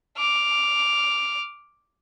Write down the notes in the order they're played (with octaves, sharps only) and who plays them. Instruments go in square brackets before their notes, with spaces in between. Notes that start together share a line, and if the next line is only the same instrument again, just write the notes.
[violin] D6 F6